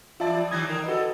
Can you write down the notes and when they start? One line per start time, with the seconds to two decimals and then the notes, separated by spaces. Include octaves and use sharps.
0.20 E2 G2 F4 D5 E5 A5
0.51 C3 D#3 G3 D#6 G#6 A#6
0.66 D3 A#4
0.84 G2 F#4 A4 B4 D#5